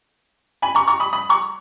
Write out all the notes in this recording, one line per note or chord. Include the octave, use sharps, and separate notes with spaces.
G#5 B5
A#5 C#6
A#5 C#6
B5 D#6
B5 D#6
A#5 C#6